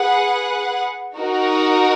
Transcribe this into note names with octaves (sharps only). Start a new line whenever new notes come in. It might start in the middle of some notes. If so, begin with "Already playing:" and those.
Already playing: G#4 B4 F#5
D#4 F#4 A#4